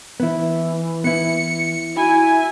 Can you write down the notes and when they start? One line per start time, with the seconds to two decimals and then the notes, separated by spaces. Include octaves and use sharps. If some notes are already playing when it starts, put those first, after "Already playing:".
0.20 E3 B3 E4
1.04 B3 E4 C#7
1.96 E4 F#4 G#5